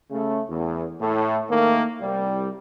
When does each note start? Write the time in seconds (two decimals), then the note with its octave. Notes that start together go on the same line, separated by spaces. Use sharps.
0.11 C#3 A3
0.49 E2
1.01 A2 A3
1.51 D#3 A3 A#3
2.00 C2 G3